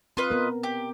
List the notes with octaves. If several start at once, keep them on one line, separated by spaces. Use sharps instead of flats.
C4 F4 B4 D#5
B3 A#4
G4